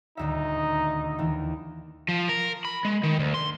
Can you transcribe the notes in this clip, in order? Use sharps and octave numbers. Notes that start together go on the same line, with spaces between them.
D#1 D2 D#4 E5
D#2 E3 D#4
F3
A#4
B5
G#3
D#3
D2
C6